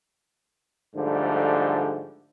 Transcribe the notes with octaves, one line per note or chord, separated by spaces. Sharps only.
G#2 D3 F3 G3 A3